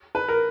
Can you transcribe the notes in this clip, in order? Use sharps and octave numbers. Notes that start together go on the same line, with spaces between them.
B4
A#4